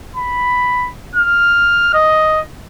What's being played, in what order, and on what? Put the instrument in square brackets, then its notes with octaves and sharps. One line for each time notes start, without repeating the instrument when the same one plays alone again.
[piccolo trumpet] B5
F6
D#5